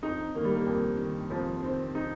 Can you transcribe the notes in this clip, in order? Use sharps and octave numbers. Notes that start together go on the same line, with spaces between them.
F2 D#4
D#3 A#3
G3
A#3
F2
D#3
F2 F3
D#3 C4
D#4